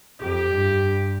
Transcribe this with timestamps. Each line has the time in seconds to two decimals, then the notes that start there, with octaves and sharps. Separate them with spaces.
0.21 F2 G4
0.52 G2